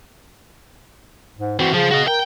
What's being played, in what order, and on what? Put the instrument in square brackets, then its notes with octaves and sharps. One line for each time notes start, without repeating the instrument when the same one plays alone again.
[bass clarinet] G#2
[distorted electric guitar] E3 C4 [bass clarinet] F#4
[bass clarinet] C#3 [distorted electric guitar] F3
[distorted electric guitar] F#4 D#5
[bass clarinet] A#4 [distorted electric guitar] G5